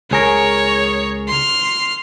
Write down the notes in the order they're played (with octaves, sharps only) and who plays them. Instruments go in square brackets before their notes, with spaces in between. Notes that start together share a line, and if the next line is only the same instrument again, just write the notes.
[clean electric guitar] C#2 G#4 A#4 [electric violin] C#5
[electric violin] C6 F6